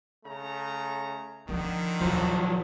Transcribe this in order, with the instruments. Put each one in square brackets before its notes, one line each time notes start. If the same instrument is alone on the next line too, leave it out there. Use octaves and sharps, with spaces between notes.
[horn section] C#3 A3 A#5
[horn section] D3 D#3 [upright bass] F3
[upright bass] D#1 [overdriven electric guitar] F3 F#3